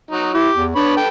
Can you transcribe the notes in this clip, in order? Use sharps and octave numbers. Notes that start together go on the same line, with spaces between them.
F#3 D#4
E4 G4
E2
B3 D4 C#5 B5
A4 B4 G5